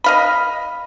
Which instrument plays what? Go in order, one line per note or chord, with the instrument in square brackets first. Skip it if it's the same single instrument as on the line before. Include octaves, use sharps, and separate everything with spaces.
[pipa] D#5 F5 B5